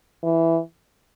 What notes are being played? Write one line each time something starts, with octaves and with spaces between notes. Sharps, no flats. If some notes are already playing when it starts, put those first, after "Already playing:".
E3